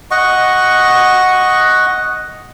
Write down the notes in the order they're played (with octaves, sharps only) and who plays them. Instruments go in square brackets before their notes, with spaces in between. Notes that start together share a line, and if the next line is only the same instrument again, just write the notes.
[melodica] D#5 F#5 C#6